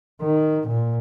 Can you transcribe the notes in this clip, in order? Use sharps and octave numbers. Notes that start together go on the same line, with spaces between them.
D#3
A#2